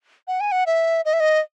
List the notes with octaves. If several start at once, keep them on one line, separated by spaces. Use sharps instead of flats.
F#5
G#5
F#5
E5
D#5
E5
D#5